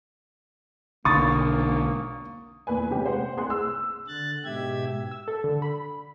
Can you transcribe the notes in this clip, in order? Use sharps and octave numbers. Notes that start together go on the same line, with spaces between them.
B1 D3 A#3 C#6 D#6 A6
E2 A#2 B4 G#5
C3 G#3 C#4 G4 B4
C5 F#5
C2 G#4 C6 F#6
E6
D3 F#6 A6
G#2 B2 G4 E5 G#6
E6
A4
D3
B5